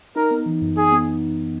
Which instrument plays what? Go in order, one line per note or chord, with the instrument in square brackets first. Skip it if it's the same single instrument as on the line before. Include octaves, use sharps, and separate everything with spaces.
[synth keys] D#4 [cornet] A#4
[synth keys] B3
E3
F#2
[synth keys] D#4 [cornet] G#4
[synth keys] B3